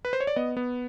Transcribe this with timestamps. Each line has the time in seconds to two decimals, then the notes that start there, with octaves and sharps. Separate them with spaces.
0.05 B4
0.13 C5
0.20 C#5
0.27 D5
0.36 B3 D#5
0.57 B3